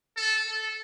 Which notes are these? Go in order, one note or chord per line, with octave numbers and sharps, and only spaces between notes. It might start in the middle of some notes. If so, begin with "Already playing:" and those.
A4
A4